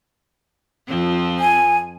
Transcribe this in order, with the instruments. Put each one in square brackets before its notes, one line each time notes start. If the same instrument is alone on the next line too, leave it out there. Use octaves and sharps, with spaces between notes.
[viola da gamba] F2 F3 C4
[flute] G#5